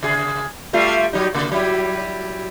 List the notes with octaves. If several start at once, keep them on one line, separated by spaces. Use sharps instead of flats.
C#3 G#4
G3 A3 F4
F#3 G3 D#4
C#3 A#3
F#3 G3 E4